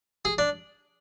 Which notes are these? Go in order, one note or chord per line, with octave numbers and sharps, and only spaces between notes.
G#4
D4